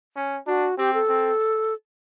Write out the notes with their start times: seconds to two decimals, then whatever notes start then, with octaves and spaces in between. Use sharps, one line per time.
0.16 C#4
0.47 D4 F#4
0.78 C4 G4
0.94 A4
1.09 C4